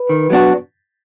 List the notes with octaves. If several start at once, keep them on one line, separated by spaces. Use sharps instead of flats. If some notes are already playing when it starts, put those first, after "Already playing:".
Already playing: B4
D#3
F#3 B3 D4 F#4